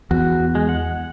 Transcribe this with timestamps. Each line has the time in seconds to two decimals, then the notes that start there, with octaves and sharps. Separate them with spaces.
0.11 E2 F#4
0.55 G#3
0.69 F#5